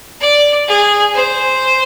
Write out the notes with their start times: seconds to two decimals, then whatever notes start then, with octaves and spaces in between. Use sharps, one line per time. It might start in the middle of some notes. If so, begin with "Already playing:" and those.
0.21 D5
0.68 G#4
1.14 C5